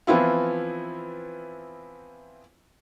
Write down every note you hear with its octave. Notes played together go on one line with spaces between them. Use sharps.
E3 F3 B3 C4 E4 F4